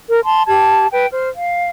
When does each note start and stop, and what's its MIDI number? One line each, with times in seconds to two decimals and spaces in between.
0.09 0.19 70
0.24 0.43 81
0.24 0.43 84
0.47 0.86 67
0.47 0.86 81
0.47 0.86 92
0.90 1.06 71
0.90 1.06 79
1.12 1.28 72
1.12 1.28 89
1.35 1.70 77